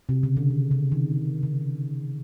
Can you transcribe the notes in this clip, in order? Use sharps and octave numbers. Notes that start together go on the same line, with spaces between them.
C3
C#3
D3
D#3
C#3
D#3
C#3
C#3